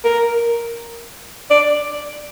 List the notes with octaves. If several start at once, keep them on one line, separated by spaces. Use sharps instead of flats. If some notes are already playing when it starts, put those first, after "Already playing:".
A#4
D5